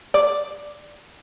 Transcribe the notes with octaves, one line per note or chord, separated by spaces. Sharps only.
D5